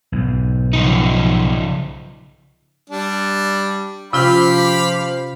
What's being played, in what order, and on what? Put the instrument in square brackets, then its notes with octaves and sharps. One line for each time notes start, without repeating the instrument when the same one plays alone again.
[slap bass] B1 G#2
[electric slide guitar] C#3 F3 D#4
[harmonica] G3 D4
[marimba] C3 C#4 F4 [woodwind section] F3 G4 [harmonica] F5 B5